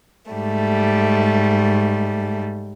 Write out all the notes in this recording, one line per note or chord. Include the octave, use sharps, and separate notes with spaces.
G#2 G3 A3